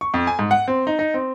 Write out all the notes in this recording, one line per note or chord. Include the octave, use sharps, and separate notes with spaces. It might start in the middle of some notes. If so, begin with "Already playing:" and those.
C#6
F2
G#5
G#2
F#5
C4
D#4
D#4
C4